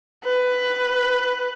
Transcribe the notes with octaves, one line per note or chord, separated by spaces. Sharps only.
B4